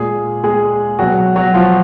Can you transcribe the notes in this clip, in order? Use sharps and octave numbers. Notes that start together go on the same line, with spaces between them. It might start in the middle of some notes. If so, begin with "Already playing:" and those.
Already playing: A#2 G#3 G#4
G#3 G#4
B2 F#3 G#3 F#4
F#3 F#4
F3 F4